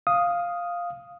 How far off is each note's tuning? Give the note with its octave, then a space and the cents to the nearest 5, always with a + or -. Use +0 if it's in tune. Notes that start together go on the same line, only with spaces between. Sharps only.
F5 +0 D#6 +0